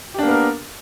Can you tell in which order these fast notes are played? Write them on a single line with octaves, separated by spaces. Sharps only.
G4 D4 A#3 B3 A#4